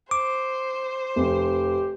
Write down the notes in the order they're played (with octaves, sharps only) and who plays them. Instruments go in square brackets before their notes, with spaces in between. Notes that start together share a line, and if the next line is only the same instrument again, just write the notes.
[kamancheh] C5 [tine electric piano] D6
[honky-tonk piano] F1 [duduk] G4